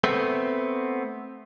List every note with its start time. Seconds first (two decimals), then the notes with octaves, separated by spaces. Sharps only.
0.04 A3 B3 C4